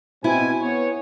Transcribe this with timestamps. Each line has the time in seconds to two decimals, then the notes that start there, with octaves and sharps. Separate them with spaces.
0.24 B2 C4 E4 G#5
0.62 B3 G#4 C#5